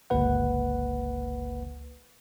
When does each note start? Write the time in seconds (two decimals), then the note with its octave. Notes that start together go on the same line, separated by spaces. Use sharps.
0.10 G1 C#2 A#3 B4 F#5